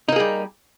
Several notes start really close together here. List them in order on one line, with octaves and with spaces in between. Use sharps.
D#4 A#3 G#4 G3